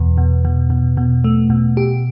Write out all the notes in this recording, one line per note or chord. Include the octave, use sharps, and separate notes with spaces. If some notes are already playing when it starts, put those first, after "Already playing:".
Already playing: E2 B2
B2
B2
B2
B2
A3
B2
G4